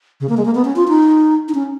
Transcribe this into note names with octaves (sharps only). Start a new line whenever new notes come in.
C#3
A#3
G#3
A#3
B3
C#4
F4
D#4
D#4
C#4